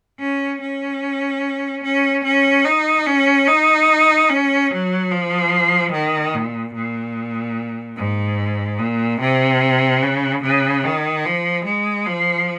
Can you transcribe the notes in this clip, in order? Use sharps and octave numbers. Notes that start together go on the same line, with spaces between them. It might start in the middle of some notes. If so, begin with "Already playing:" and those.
C#4
C#4
C#4
C#4
D#4
C#4
D#4
C#4
F#3
F3
D#3
A#2
A#2
G#2
A#2
C3
C#3
C#3
D#3
F3
G#3
F3